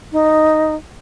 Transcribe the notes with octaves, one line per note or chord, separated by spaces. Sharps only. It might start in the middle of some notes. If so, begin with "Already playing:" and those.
D#4